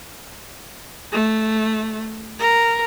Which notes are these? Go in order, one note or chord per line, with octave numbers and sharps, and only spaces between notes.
A3
A#4